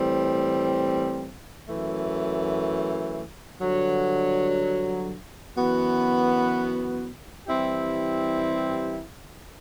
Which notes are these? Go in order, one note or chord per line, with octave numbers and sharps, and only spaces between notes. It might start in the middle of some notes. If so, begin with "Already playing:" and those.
Already playing: A2 E3 G3 C4
F#2 E3 A3
G2 D3 F#3
F#2 E3 B3 F#4
E3 G3 C4 E4 G4